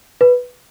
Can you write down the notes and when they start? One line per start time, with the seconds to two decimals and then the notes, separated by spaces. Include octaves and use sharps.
0.21 B4